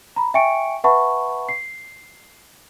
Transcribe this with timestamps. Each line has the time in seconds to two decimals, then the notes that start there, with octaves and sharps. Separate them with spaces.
0.16 A#5 B5
0.34 E5 G5 G#5 C#6 C#7 D7
0.84 B4 E5 F#5 A5 B5 C#6
1.49 C7